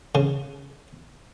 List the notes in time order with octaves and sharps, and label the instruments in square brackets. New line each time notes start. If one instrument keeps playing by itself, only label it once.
[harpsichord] C#3